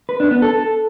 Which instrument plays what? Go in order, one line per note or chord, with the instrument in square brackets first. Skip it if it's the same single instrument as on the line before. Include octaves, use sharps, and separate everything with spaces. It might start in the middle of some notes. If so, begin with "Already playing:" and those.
[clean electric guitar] B4
D4
B3
A4